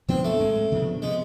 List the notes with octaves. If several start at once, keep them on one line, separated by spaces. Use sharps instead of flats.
C3 F3 B3 C4 D4
A3
A2 G#3 C4
C3 F3 B3 D4
C3 F3 G#3 B3